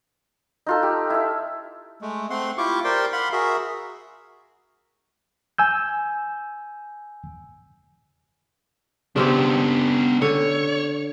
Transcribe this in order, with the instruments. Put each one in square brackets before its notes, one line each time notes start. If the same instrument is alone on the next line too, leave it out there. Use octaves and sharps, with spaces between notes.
[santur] D#4 F4 A4
G4
E4 E5
[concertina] G#3 A3
A3 C4 F#5 C6
E4 F4 G4 C#6 D6
G4 A#4 C5 D5 G5 C6
F5 F#5 B5 C6
F#4 G#4 A#4 E5
[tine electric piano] G#5 E6 G6
[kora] C#3 C4 G4 [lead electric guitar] B3 D4
[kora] D3 [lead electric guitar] C#5